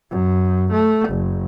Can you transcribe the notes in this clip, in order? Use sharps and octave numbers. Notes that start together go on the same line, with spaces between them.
F#2
A3
F#1